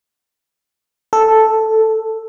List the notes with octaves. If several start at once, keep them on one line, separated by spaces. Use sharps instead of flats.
A4